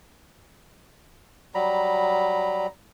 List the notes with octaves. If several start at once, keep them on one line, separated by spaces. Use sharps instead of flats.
F#3 G3 A#5 B5